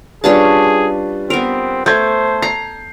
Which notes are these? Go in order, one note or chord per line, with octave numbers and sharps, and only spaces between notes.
G3 C#4 D4 F4 G#4 B4 A5
B3 C4 A#4
A3 C5 G6 G#6
A#5 C7